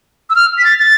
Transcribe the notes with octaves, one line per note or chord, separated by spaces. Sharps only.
E6
F6
B6
A6
A6